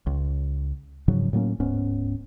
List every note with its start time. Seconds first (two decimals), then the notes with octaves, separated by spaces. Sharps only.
0.06 C#2
1.08 G#2 C#3 F3 F#3
1.33 A2 F#3 A#3 C#4
1.60 D1 G#2 B3 C#4